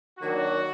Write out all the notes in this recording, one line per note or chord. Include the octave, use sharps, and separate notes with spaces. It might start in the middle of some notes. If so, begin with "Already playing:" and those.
D#3 F#3 A#3 D4 F#4